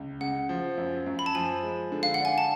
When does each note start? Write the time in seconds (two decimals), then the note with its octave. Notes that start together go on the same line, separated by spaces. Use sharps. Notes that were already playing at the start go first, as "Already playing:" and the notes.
Already playing: C#2
0.21 C#3 F#5
0.49 F3
0.77 F#2
1.06 F#2
1.19 B5
1.26 A5
1.35 F3 G#5
1.63 G#3
1.92 D3
2.03 F5
2.14 F#5
2.20 D4 G#5
2.38 A5